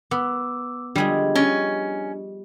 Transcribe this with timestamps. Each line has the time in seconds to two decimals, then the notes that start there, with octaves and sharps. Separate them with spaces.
0.11 B3 D6 E6
0.96 D3 F3 G3 G#3 D4 G#4
1.35 C#4 D#5 G5